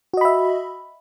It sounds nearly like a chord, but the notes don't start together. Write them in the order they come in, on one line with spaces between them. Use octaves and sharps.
F#4 D#5 B5 E5